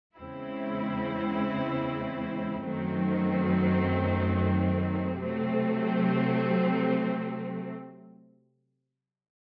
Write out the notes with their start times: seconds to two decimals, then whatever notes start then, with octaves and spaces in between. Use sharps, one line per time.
0.15 E2 C#3 G#3 C4 E4
2.67 F#2 D#3 F#3 A3 C4
5.17 C3 F#3 A3 C4